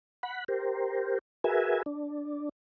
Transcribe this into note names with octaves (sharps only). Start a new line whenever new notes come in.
F#5 B5
G4 A#4 C5
F#4 G#4 A#4 B4 E5 G#5
D4